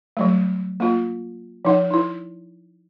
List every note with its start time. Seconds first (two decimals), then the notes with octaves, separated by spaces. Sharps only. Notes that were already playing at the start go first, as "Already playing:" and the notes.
0.17 F#3 G3 A3
0.80 A#3 F4
1.65 F3 D#4 F#5
1.91 D#4 E4